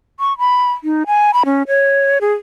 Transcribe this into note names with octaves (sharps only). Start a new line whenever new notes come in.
C#6
B5
D#4
G#5
B5
C#4
C#5
G#4